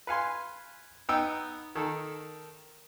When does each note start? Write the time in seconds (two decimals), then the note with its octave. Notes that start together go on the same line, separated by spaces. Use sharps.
0.07 B4 F5 G#5 C6
1.09 B3 D#4 G5 E6
1.75 D#3 A4